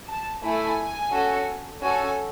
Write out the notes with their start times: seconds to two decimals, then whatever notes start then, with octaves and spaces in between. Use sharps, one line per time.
0.09 A5
0.44 A3 E4 A4 G#5
1.12 C#4 F#4 A4
1.81 C#4 F#4 A4 G#5